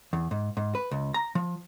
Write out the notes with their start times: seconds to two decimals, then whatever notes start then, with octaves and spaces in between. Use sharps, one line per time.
0.13 E2
0.31 G#2
0.57 G#2
0.75 B4
0.91 C#2
1.14 A#5
1.35 F3